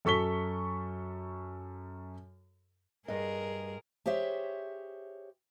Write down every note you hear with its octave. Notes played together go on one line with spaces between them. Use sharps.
F#2 A4 C#6 B6 G7
G2 G#4 A#4 D#5
G4 G#4 C5 C#5 E5